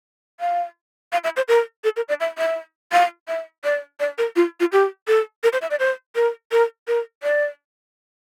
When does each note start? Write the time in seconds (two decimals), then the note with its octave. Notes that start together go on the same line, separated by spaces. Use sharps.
0.40 F5
1.12 F5
1.24 E5
1.37 C5
1.48 A#4
1.84 A4
1.97 A#4
2.09 D5
2.21 E5
2.38 E5
2.92 F5
3.28 E5
3.64 D5
4.00 D5
4.18 A#4
4.36 F4
4.60 F4
4.72 G4
5.08 A4
5.43 A#4
5.53 C5
5.62 E5
5.71 D5
5.80 C5
6.15 A#4
6.52 A#4
6.88 A#4
7.23 D5